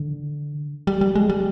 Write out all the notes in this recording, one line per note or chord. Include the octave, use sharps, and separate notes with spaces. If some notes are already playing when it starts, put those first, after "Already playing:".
Already playing: D3
G3
G3
G#3
G3